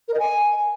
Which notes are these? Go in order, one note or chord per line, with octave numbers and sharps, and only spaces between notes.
A#4
D#5
G#5